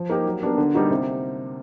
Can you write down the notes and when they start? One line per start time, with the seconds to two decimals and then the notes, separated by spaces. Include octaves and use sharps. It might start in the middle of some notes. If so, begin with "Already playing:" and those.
Already playing: F3
0.09 A#3 D#4 G4 A#4
0.26 F#3
0.42 B3 D4 G4 A#4
0.58 D3
0.74 G3 A#3 D#4 F#4
0.90 C3